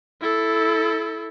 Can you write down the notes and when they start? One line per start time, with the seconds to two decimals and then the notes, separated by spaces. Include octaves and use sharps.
0.21 E4 A4